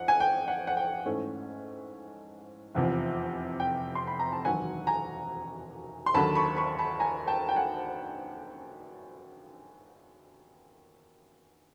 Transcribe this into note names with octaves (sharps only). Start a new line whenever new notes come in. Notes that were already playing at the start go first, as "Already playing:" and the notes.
Already playing: F2 F#5
G#5
G5
F#5
F#5
G5
G#2 E3 A3 C#4
F1 E2 C3 F3
G5
C6
B5
A#5
A5
E1 D#2 D#3 F#3 F#5 G#5
G#5 A#5
C6
D#2 D3 F#3 A5 B5
B5 C#6
B5 C#6
A5 B5
G#5 A#5
G5 A5
G5
F#5 G#5